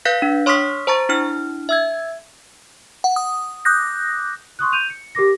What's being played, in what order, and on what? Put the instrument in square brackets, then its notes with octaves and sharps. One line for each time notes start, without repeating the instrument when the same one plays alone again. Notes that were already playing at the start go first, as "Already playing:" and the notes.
[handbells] B4 F5 F#6 G6 A#6 B6
D4
C#5 C6 C#6 D#6 F6 B6
C5 A5 A#5 C#6 A6
D4 E4 F6
E5 E6 G#6
[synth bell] F#5
D#6
D6 D#6 F#6 G6 A#6
[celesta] C6 C#6 D#6 F#6
G6 D#7 F7
C#7
G4 A#4 D6 A#6